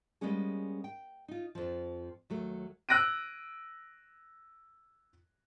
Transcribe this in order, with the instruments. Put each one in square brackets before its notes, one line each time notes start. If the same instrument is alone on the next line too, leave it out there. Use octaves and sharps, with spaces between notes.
[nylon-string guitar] G3 G#3 A#3 B3 C#4 G#4
G5
D#4 F4
F2 F3
D#2 F#3 A3
[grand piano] E6 F#6 A#6 D7 D#7